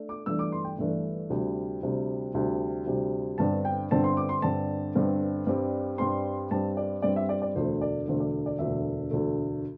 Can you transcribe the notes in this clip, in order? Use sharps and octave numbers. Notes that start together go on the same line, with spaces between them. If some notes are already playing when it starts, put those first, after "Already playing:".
Already playing: A3 D4
D6
G1 G2 E3 A3 D4 E6
D6
C6
G5
G1 G2 E3 A3 D4
D2 C3 G3
D2 C3 G3
D2 C3 G3
D2 C3 G3
G1 G2 D3 C4 A5
G5
G1 G2 D3 C4 A5
C6
D6
C6
G1 G2 D3 C4 A5
G1 G2 D3 C4
G2 G3 C4
G2 G3 C4 C6
G2 G3 C4 A5
D5
G2 G3 C4 D5
E5
D5
D5
E1 D2 D3 A3 C5
D5
E1 D2 D3 A3 C5
D5
D5
E1 D2 D3 A3 E5
E1 D2 D3 A3